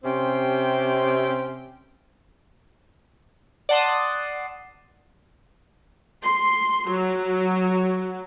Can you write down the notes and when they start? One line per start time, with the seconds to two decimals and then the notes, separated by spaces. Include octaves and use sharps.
0.03 C3 C4 C#4 G4
3.69 D5 F#5 A5 C6 D#6
6.23 C6
6.90 F#3